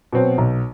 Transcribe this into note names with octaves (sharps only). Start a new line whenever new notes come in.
B2 F#3 C4
B1